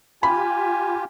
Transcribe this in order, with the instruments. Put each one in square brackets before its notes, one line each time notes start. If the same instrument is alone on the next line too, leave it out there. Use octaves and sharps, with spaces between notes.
[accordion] F4 G4 [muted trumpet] G#5 [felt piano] B5